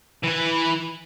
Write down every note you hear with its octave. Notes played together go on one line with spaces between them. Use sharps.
E3 B4